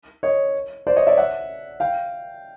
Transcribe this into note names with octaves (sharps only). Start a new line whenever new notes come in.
C#5 D#5
C5 D5
C#5 D#5
D5 E5
E5 F#5
F5 G5